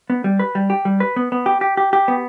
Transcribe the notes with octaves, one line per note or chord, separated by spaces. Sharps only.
B3
G3
B4
G3
G4
G3
B4
B3
B3
G4
G4
G4
G4
B3